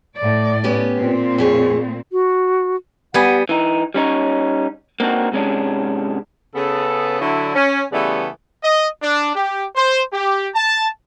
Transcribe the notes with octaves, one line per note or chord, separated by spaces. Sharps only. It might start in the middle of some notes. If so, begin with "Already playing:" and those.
A2 D5
B3 C#4 G4
A#2 C4
F2 G#4 C#5
F#4
G3 B3 F#5 G#5
E3 D#4
G3 C#4 D#4 C#5
A#3 C4 D4 D#4 F#4
G#2 C3 G#3 C#4 D4
C#3 B3 A4
D3 F#3 E4
C#4
C#3 E3 G3 A3 B3
D#5
D4
G4
C5
G4
A5